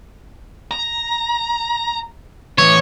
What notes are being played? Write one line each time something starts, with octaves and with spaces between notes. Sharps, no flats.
A#5
A2 E3 C#5